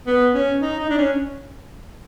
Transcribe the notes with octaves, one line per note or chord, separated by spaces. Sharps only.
B3
C#4
D#4
D#4
D4
C#4